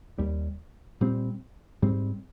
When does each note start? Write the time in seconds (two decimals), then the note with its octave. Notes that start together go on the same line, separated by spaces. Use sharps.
0.18 D#2 D#3 G3
1.01 A#2 G3 C4
1.82 G#2 G3 C4